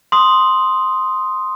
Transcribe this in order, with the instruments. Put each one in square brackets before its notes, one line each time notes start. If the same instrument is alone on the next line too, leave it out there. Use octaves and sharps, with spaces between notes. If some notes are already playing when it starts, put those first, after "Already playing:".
[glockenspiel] C6 D#6